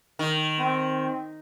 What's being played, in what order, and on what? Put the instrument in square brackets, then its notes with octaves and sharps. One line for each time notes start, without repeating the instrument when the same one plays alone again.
[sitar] D#3
[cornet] C4